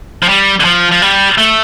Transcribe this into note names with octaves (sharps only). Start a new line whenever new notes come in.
F3
G3
D3
F3
F3
G3
A3